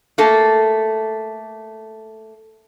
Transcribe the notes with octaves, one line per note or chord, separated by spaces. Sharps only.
A3 A#3 A4